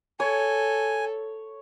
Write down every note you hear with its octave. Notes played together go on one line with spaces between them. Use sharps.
A4 C#5 G#5